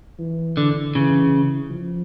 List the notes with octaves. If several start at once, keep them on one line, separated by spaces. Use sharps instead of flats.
E3
D3
C#3 E3
F3